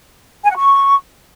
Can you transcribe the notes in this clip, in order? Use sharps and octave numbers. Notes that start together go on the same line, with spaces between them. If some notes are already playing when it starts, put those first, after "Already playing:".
G#5
F#5
C#6